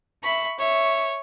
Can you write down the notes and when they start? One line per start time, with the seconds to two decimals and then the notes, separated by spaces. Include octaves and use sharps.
0.23 E5 B5 C#6
0.59 C#5 E5